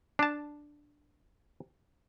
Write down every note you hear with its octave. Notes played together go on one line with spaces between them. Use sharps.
D4 A5